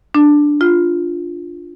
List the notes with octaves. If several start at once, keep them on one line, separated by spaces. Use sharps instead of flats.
D4
F4